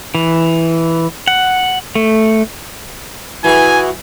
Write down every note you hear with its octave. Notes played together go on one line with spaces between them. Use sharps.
E3
F#5
A3
E3 E4 F#4 G#4 G#5